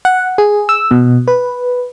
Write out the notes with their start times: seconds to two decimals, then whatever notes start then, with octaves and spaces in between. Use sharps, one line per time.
0.05 F#5
0.38 G#4
0.69 E6
0.91 B2
1.28 B4